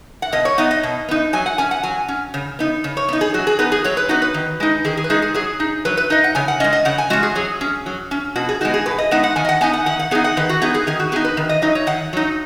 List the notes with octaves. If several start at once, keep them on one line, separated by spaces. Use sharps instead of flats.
F#5
B2 D#5
C#5
B3 D#4 D#5
D#5
B2
B3 D#4
F#3 G#5
F#5
C#4 G#5
F#5
F#3 G#5
C#4
C#3
B3 D#4
C#3
C#5
B3 D#4
G#4
F#3 F#4
G#4
B3 D#4 B4
G#4
F#3 C#5
B4
B3 D#4 F#4
B4
D#3
G#3 D#4
D#3 G#4
G#4
B4
G#3 D#4 G#4
G#4
F#3 G#4
D#4
F#3 B4
B4
D#4 D#5
F#5
C#3 G#5
F#5
G#3 C#4 D#5
D#5
C#3 F#5
G#5
G#3 C#4 F#4
G#4
F#3 G#4
C#4
F#3
C#4
B2 F#4
G#4
G#3 B3 D#4 F#4
G#4
B2 B4
D#5
G#3 B3 D#4 F#5
F#5
D#3 G#5
D#5
F#5
B3 D#4 G#5
F#5
D#3 F#5
F#5
B3 D#4 G#4
F#5
D#3 B4
F#4
B3 D#4 G#4
G#4
D#3 G#4
F#4
B3 D#4 G#4
B4
D#3
D#5
F#3 D#4 D#5
C#5
D#3 F#5
F#3 D#4